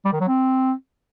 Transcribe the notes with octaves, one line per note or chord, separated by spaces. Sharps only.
G3
D#3
F#3
C4